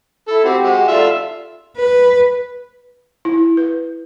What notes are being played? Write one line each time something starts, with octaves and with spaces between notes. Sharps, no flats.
E4 A4
C4 F#4 G4
G#3 F#4
F4 A4 D5 E5 F5
B4
E4
B4